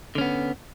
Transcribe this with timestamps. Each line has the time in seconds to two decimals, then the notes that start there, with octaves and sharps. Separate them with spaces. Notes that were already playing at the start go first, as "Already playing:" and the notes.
0.15 D3
0.18 C#4
0.21 B3